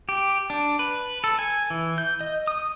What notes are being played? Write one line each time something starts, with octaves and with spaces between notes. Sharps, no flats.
G4
D4
B4
A4
G#5
E3
G6
D#5
D#6